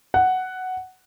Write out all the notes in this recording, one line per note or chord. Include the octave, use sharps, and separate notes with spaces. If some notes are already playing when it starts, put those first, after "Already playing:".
F#5